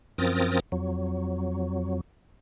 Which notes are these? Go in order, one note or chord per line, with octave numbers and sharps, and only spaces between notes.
F#2 F3 C4 A#4 D#6 A6
F2 F#3